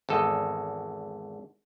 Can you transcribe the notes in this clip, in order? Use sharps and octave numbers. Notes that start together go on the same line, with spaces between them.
G#1 E2 A4 D#5